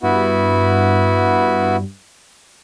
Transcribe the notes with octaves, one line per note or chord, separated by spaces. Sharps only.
G2 B3 E4 F#4